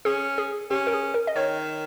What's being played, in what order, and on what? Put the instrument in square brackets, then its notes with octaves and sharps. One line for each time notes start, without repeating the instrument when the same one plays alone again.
[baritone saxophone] C#4 [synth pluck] G#4
[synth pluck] G#4
[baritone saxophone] C#4 [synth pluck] G4
[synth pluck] A#4
G#4
A#4
D#5
[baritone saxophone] D#3 [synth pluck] C#5